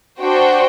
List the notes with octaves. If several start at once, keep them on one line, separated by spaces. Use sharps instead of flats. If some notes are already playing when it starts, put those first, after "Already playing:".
D4 F#4 C5 G5